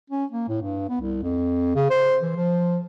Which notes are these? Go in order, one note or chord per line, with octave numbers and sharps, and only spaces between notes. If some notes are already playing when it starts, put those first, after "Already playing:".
C#4
A#3
A2
G2
B3
C2
F2
C#3
C5
E3
F3